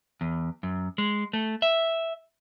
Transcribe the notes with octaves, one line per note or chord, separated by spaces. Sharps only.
E2
F#2
G#3
A3
E5